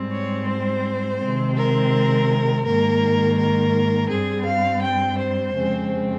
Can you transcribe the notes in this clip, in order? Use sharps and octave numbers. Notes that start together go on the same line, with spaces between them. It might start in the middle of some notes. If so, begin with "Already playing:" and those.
Already playing: G#2 G3 C4
C#5
C5
C3 D#3 G#3 C4
A#4
G#2 D#3 A#3 A#4
A#4
G2 G3 C4 G#4
F5
G5
C5
F2 C#3 G#3 C4